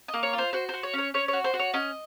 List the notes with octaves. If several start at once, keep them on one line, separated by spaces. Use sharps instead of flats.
D#5
A#3
C#5
F4
C5
F#4 C5
F#4 C5
C#5
C#4 C#5
C#4 C#5
C#5
F#4
C5
F#4
C#5
C#4 D#5